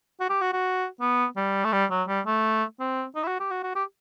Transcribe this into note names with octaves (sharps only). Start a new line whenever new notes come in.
F#4
G4
F#4
F#4
B3
G3
A3
G3
F#3
G3
A3
C4
D#4
E4
F#4
G4
F#4
F#4
G4